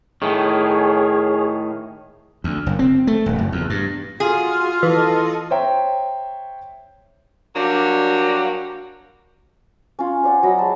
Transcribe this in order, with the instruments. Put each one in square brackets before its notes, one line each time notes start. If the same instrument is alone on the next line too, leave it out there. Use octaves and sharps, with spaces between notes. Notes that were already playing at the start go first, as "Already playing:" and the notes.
[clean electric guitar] A2 D#3 [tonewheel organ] G#4 C#5
[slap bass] D2
F#1
C4
A3
D#1
F#1
E2
G2
[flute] F4 [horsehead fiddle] F#4 [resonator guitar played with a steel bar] G#4
[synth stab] E3 [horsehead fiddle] A4 D#5
[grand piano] C5 C#5 E5 G5 A#5
[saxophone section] F#3 G3 A#3 D4 F#4
[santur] C#4 F4
C5 D5 F#5
F#3 D#5 B5
G#3 A5